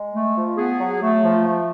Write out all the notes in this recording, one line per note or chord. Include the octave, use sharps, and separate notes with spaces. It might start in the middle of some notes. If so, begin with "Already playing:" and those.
Already playing: G#3
A3
F3
B3 G#4
F#3
A3
F3
A3